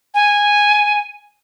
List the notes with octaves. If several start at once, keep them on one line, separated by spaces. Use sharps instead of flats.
G#5